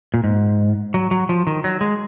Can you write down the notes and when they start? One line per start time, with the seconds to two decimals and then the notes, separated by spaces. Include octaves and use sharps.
0.14 A#2
0.24 G#2
0.94 F#3
1.11 F#3
1.29 F3
1.47 D#3
1.64 F#3
1.81 G#3